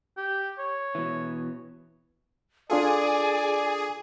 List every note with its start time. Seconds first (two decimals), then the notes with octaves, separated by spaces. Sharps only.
0.17 G4
0.58 C#5
0.95 B2 E3
2.70 D4 F4 G#4 A4 D5 G#5